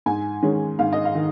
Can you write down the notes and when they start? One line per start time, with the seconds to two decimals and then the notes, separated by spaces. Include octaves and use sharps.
0.06 G#2 G#5
0.43 D#3 G#3 C#4
0.79 G#2 F5
0.93 D#5
1.05 F5
1.15 D#3